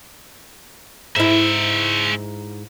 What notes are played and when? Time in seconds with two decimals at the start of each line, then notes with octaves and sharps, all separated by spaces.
1.16 G#2 G#3 E4 E5